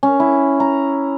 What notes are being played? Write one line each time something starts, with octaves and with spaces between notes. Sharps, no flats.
C#4
E4
A#5